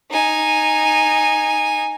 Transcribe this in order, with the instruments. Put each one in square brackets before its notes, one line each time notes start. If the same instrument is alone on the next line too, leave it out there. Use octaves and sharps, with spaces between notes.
[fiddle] D#4 G#5